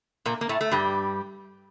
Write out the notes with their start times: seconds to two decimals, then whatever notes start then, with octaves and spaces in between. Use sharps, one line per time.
0.25 A#2 A#3
0.41 A#3
0.49 A2 A3
0.61 A3
0.71 G2 G3